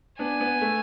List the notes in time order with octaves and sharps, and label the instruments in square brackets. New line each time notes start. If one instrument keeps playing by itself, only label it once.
[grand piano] B3 D4 [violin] G#5
[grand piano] B3
A3